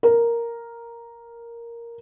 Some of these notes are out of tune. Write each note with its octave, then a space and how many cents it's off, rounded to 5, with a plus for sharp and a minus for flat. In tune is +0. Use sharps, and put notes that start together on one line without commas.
A#4 +0